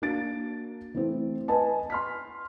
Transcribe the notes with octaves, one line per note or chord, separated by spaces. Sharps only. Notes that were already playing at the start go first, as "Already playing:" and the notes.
A#3 D4 F#4 A6 D7
E3 A3 C4
B4 D#5 G#5 A5
C6 F6 B6